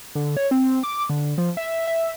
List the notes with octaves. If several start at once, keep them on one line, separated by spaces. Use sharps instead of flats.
D3
C#5
C4
D6
D3
F3
E5
E5